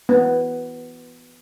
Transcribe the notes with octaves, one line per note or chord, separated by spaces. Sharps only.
B3